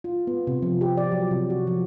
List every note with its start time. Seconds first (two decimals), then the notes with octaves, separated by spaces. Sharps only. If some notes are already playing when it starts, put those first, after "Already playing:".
0.04 F4
0.27 B3
0.47 C3
0.62 F3
0.81 G4
0.97 D5
1.12 F#3
1.31 C3
1.50 F#4
1.67 F3